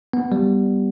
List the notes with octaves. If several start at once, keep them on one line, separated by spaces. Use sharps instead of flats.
B3
G3